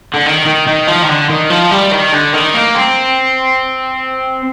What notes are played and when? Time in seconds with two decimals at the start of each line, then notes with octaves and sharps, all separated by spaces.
0.14 D3
0.26 D#3
0.46 D#3
0.67 D#3
0.88 F3
1.03 D#3
1.09 D3
1.29 D#3
1.50 F3
1.71 G3
1.92 D#3
2.13 D3
2.34 D#3
2.54 A#3
2.75 C4